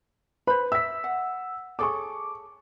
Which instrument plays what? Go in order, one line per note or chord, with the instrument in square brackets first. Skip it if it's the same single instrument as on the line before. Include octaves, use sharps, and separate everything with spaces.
[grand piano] B4 [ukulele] C5 B5
[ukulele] E5 [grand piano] E6 B6
[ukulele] F#5
[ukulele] G#4 A4 C#5 [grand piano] C#6 D6